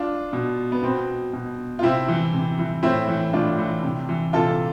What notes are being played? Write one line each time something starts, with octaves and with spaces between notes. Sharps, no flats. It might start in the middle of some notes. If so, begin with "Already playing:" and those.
Already playing: D4 F4
B2
B3
B2 C4
B2
F4
C3 C4 E4
E3
C3
E3
A2 C4 E4
E3
A2 D4 F4
E3
C3
E3
C3 F4 A4